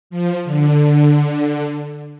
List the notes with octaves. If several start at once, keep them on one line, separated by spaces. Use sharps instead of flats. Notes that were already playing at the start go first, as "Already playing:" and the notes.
F3
D3